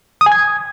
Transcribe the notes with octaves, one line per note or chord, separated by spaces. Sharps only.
D#6
G#5
G#6